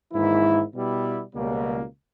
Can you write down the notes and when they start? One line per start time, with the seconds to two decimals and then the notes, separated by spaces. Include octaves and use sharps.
0.13 G#1 G#2 E3 A#3 E4
0.74 B2 G3 B3 E4 G4
1.34 C#2 B2 G3 A#3